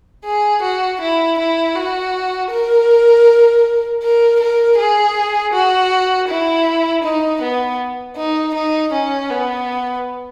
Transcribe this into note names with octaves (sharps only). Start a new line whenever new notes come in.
G#4
F#4
E4
E4
F#4
A#4
A#4
A#4
G#4
F#4
E4
D#4
B3
D#4
D#4
C#4
B3